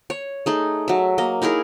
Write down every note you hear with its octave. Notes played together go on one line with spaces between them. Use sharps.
C#5
A3 D#4 G#4
F#3 E5
A#3 D#5
D#4 E4 G#4 A#4